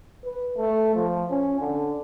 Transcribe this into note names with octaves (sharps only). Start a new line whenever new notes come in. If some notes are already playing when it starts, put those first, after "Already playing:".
B4
A3
F3
C#4
D3